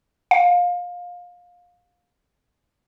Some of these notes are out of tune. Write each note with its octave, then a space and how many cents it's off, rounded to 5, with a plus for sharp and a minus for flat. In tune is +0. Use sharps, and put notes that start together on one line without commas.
F5 +25